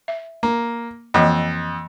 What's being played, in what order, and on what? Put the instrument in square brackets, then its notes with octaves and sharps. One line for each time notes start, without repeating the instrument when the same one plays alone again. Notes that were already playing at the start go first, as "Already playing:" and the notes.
[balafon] E5
[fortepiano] A#3
[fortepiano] F2 [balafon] E3 A#3 D#5